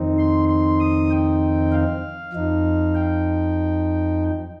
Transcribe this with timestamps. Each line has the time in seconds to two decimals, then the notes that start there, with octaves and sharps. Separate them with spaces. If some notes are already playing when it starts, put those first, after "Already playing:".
Already playing: F2 D#3 C4 D#4
0.18 C6
0.49 C6
0.80 D#6
1.11 G5
1.72 F5
2.33 F2 F3 D#4
2.95 G5